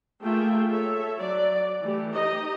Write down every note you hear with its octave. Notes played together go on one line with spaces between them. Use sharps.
A3 A#3 F4 G#4 E5 G5
A4 C#5 E5
F#3 D5
E3 A3 G4
D#4 G4 D#5